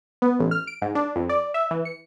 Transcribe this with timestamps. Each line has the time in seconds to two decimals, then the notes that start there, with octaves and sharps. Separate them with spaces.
0.22 B3
0.39 A1
0.51 F6
0.67 D7
0.82 G#2
0.95 D4
1.16 F2
1.29 D5
1.54 E5
1.71 E3
1.85 C#7